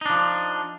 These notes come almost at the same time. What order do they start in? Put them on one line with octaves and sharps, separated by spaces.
D#4 D4 F3